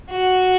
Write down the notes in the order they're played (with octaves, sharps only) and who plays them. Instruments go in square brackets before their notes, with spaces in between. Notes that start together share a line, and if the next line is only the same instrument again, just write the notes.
[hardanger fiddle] F#4